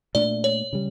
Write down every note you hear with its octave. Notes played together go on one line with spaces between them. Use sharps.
A#2 A3 D4 D5
C#5
C#3 G3